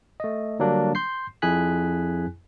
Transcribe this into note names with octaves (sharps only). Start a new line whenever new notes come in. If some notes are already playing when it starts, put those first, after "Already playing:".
A3 D#5
D3 F#3 G3 A#3 D4
C6 G6 C7
F2 E4 G#4 G#5 F#6 B6